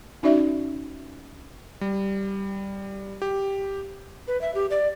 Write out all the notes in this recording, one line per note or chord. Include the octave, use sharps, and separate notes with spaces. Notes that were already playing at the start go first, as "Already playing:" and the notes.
C#4 D#4 F#4 D5 E5
G3
G4
B4
E5
G4
D5